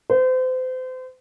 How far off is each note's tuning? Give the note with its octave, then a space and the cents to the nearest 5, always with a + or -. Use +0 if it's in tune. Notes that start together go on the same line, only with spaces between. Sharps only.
C5 -35